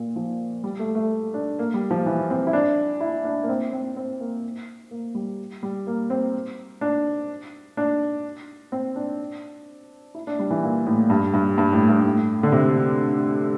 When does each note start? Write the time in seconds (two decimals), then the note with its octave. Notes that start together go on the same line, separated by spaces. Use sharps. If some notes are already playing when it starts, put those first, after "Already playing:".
Already playing: A#2
0.16 F3
0.64 G3
0.79 A3
0.95 A3
1.34 D4
1.59 A#3
1.74 G3
1.91 F3
2.06 E3
2.30 C4
2.47 E4
2.53 D4
3.00 E4
3.25 D4
3.43 A#3
3.49 C4
3.73 C4
3.97 C4
4.21 A#3
4.91 A#3
5.15 G3
5.63 G3
5.87 A#3
6.10 C4
6.81 D4
7.77 D4
8.72 C4
8.96 D4
10.15 E4
10.27 D4
10.39 G3
10.50 E3
10.63 A#2
10.86 A2
11.10 G2
11.34 G2
11.58 G2
11.73 A2
11.89 G2
12.05 A2
12.43 D3
12.52 C3